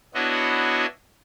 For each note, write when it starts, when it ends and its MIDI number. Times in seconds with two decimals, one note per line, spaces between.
0.14 0.86 59
0.14 0.86 62
0.14 0.86 64
0.14 0.86 66
0.14 0.86 73
0.14 0.86 75